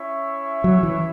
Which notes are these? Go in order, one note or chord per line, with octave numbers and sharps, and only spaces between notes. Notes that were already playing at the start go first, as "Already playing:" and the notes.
Already playing: C#4 E4 C#5 E5
F#3
E3